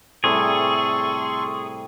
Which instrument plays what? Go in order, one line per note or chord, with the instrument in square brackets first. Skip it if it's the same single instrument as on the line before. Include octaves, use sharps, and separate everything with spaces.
[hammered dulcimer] A2 C3 G3 [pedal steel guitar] G#4 [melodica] A4 C6 C#6